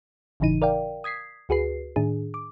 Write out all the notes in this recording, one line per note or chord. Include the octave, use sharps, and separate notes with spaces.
G1 A2 C#3 E3 D#4 D#7
A#4 D5 F5 G5
D#6 G#6 B6 C7
D2 F#4 G#4 B4 C7
A2 D#3 D4 G#4
D6